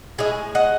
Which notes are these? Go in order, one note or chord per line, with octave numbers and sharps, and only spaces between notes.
A2 G#3 E4 G#4
D#5 F#5